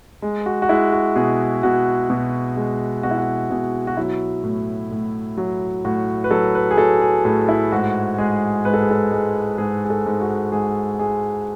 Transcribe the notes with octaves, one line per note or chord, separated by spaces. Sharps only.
G#3
F#4
F#4
G#3 E4
F#4
B2 G#4
B2 F#4
B2
G#3
B2 F#4
E4
F#4
B2 G#4
F#4
F#3 E4
A2
A2
F#3
A2 F#4
B4
F#3 A4
B4
G#4
F#3 A4
G#4
A2 G#4
E4
G#2 F#4
G#3 G#4
G#2 B4
A4
G#4
A4
G#3 G#4
G#2 G#4
G#4
A4
G#2
F#4
G#2 G#4
G#3 G#4